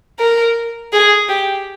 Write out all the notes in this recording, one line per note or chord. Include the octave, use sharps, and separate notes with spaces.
A#4
G#4
G4